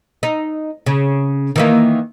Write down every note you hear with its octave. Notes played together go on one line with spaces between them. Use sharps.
D#4
C#3
D#3 E3 A#3